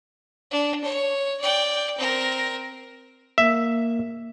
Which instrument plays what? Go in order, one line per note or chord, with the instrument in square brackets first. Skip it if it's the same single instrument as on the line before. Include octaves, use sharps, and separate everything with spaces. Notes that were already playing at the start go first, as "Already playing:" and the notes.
[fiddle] D4
C#5
D5 G5
C4 A#4
[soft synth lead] A#3 [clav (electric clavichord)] E5